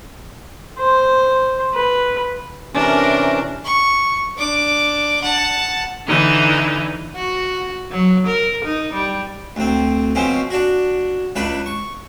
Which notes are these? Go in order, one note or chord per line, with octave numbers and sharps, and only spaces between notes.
C5
B4
C3 E3 C#4 D4 A#4
C#6
D4 D6
F#5 A5
D3 E3 D#4
F#4
F#3
A#4
D#4
G3
D2 C4
B2 F3 C4 C#4
D4 F#4
C#2 D4 B4
C#6